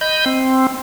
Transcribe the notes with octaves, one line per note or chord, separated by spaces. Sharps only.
D#5 B5 G6
C4